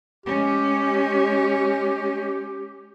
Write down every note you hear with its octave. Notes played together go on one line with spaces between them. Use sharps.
G#3 C#4 G4